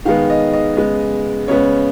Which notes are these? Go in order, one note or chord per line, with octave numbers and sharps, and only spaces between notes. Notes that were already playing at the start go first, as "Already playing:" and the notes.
D#3 G#3 B3 F5
D#5
D#5
C#3 G#3 B3
C#3 G#3 B3 C#5